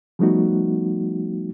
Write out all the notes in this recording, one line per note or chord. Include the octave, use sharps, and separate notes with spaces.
F3 G3 A3 B3 D#4 F#4